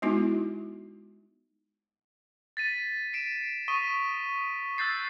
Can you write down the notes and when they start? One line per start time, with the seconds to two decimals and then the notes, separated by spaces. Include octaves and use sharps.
0.02 G#3 B3 D#4 E4 F#4
2.57 A6 B6 D#7
3.13 C7 D7 E7
3.68 C#6 D#6 B6 D#7 G7
4.78 E6 F#6 G6 A6 C7